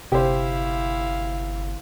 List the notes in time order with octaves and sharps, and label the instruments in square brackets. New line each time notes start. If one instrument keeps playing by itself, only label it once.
[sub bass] G1 [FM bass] C3 [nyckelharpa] E4 F5 [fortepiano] G4 C5